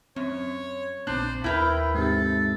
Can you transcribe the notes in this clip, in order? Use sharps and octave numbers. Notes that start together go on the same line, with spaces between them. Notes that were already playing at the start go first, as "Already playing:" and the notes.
F#2 C4 C#5
A#1 B3 C4 D4 C5 F#6
D#2 E4 A#4 B4 G5
G#2 C3 A4